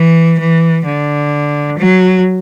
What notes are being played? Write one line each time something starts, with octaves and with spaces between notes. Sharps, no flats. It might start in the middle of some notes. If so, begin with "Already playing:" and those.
Already playing: E3
E3
D3
F#3